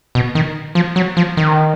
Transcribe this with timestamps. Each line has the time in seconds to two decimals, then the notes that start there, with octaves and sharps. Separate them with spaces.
0.15 B2
0.35 D#3
0.75 F3
0.96 F#3
1.17 F3
1.37 D#3